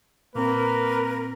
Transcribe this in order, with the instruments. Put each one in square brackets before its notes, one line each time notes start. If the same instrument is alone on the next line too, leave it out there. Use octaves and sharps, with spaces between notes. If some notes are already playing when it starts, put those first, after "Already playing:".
[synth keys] A#2 C4 [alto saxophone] A#3 [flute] A#4 [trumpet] B4